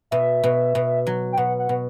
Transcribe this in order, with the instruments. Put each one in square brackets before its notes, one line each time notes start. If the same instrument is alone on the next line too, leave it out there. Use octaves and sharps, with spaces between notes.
[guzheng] B2 [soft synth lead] E5
[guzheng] B2
B2
F#3
[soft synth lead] G5
[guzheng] B2 [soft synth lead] F#5
[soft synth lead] F#5
[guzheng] B2